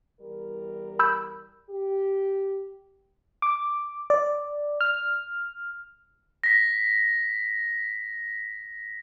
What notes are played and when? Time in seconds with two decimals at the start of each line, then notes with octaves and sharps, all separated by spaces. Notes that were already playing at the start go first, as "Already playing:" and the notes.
0.20 E2 G3 A#4
0.99 B5 E6 G6
1.69 G4
3.42 D6
4.10 D5
4.81 F6
6.44 A#6 B6